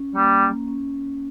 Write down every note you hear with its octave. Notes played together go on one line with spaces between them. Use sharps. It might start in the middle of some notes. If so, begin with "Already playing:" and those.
Already playing: C#4
G3 A#3
C#4